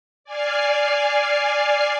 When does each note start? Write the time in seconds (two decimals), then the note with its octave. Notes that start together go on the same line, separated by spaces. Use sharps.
0.24 D5 G#5 F6 C7